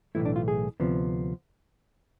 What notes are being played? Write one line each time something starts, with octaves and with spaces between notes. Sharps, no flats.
B1 A2 E3 A3 E4
D4
F4
G#4
D2 C3 F3 B3